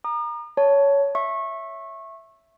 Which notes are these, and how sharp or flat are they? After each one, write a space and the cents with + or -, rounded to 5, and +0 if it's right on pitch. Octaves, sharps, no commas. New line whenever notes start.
A#5 +10 D#6 -45
C#5 +15 A5 +0
E5 +0 C#6 -25